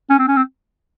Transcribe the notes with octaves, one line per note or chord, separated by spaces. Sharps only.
C#4
C4
C#4
C4